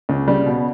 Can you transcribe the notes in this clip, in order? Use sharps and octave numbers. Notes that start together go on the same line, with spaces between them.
C#2
C#3 G3
B2